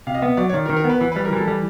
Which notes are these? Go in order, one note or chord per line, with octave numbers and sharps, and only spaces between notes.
C3 F5
D#5
B3 E5
F#3 D5
C#5
D#3 D5
A#4
D#3
A#4
B3 B4
E3 B4
G3 B4
A#4
E3 A4
G3